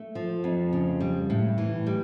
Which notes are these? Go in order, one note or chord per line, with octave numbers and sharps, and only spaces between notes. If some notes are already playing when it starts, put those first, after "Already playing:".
Already playing: A3
F3
F2
C#3
G3
A2
E3
G3